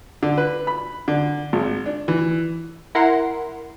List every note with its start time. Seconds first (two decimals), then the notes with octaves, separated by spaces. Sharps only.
0.23 D3
0.37 B4
0.67 B5
1.08 D3
1.53 G#1
1.86 D4
2.08 E3
2.95 E4 A#4 F#5 C6